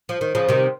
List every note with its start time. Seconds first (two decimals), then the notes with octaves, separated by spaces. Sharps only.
0.09 F3
0.21 D#3
0.35 C#3 F3
0.49 C3 D#3